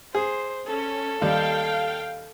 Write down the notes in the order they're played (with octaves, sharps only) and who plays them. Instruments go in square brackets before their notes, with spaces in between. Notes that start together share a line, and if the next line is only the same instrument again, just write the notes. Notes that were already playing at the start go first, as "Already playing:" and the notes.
[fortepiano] G#4 [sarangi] C5
[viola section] C#4 [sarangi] A4
[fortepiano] D#2 G3 [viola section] F5 G5